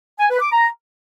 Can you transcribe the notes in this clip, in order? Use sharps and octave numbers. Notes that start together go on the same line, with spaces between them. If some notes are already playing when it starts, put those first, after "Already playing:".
G#5
B4
D6
A#5